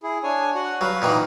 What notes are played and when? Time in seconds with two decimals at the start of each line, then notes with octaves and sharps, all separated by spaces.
0.03 E4 G#4
0.23 D4 C#5 G#5
0.55 F#4 F#5
0.81 F#3 B4 F5
1.02 A#2 D#3 E3